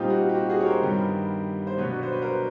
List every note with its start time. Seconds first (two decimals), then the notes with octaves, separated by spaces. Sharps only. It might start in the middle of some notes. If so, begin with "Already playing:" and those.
Already playing: A#2 G3 C4 D#4 F4 G4
0.10 F#4
0.29 G4
0.35 F#4
0.50 F#4 G#4
0.61 C#5
0.66 A#4 C5
0.82 G2 D#3 G3 B3
1.67 C5
1.78 B2 F#3 B3 D4 B4 C#5
2.03 C5
2.12 B4
2.22 A#4 C5